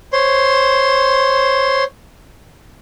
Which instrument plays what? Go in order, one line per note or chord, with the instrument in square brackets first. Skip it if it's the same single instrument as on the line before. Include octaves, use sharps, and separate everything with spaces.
[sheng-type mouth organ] C5 C#5 C6